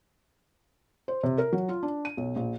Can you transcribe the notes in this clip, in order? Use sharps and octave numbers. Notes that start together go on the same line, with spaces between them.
C5
C3
A#4
F#3
F4
D4
D#7
B1
A#1